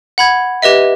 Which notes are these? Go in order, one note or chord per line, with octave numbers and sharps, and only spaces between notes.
F#5 B5 G#6
G4 B4 D#5 E5